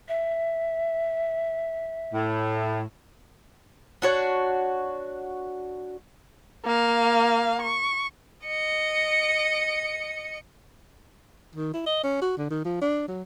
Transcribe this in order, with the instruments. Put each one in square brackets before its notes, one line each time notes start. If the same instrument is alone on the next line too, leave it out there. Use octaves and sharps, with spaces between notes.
[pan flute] E5
[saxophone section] A2
[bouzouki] D4 F#4 C#5
[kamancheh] A#3 F5
C#6
[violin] D#5 C#7
[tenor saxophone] D#3
E4
D#5
C#4
F#4
D3
D#3
F3
D4
F#3